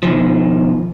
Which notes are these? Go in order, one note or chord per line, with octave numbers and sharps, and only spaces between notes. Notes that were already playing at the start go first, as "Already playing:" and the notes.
B2 D#3 F3